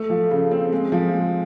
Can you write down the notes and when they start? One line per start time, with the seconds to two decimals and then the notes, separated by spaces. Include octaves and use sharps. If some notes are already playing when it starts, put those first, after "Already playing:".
Already playing: A3
0.10 F3
0.31 C#3
0.51 C4
0.72 G#3
0.92 F3
1.13 G#3